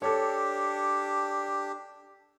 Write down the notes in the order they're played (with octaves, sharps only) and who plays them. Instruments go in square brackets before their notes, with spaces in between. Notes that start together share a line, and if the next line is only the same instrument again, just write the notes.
[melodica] D4 G4 [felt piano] A4 C#5